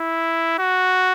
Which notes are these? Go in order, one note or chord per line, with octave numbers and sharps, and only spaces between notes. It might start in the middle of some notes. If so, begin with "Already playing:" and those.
Already playing: E4
F#4